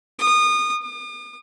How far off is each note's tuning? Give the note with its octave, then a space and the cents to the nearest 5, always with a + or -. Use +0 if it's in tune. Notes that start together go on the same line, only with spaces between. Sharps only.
D#6 -25
D#6 -45